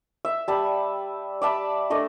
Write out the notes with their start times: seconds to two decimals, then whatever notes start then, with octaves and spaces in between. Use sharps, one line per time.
0.25 E5
0.48 G3 A5 B5
1.42 D5 E5 A5 B5
1.90 A3 D4 D#5